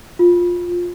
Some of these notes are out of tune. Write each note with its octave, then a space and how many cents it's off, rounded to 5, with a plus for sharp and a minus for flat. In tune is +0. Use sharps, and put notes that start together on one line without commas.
F4 +15